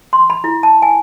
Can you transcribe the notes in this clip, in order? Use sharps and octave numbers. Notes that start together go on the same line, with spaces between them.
C6
B5
E4
A5
G#5